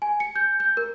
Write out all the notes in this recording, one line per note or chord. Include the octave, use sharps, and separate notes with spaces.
G#5
C#7
G6
G6
A#4